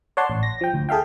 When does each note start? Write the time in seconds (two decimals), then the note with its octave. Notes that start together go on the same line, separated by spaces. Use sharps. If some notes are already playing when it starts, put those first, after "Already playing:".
0.17 C#5 D5 F#5 A5 C6
0.30 A1
0.43 A#6
0.61 F3 G5
0.74 D2
0.89 G#4 A4 E5 F5 G5